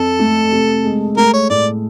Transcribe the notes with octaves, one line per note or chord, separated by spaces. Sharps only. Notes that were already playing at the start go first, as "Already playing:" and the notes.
Already playing: F2 A4
A3
C3
G#3
A3 A#4
C#5
A2 D5